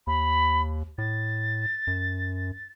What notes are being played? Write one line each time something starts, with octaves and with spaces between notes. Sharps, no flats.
D#2 B5
A2 A6
F#2